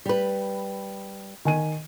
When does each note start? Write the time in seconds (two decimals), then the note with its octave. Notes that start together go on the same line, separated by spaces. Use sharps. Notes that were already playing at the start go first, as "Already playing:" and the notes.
0.06 G3 B4
1.45 D#3 G#5 D#7